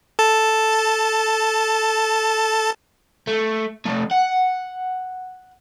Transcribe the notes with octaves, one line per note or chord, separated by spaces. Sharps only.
A4 A5
A3
F3 A3
F#5